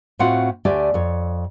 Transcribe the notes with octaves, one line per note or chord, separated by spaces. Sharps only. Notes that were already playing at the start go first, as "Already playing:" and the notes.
A2 C4 F4 F#4 F#5
D2 A3 G4 D5 G#5
F2 C#5